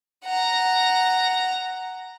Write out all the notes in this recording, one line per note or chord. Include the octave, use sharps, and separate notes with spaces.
F#5 A#5